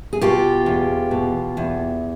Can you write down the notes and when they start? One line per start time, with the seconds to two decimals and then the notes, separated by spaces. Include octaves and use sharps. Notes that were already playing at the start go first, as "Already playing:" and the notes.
0.13 G#4
0.21 B2 F4 G4
0.66 E2
1.11 B2
1.57 E2